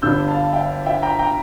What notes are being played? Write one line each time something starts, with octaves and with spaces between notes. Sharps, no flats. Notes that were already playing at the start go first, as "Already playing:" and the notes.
G1 G2 D3 E6 G6
F5 A5
E5 G5
E5 G5
G5 A#5
G5 A#5